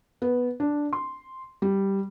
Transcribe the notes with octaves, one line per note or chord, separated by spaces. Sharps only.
B3
D4
C6
G3